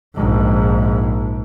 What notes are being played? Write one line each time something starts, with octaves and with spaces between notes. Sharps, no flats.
A#1 G#2